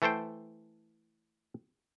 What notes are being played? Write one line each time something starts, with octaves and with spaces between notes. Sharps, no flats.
E3 A3 A4 C5 G5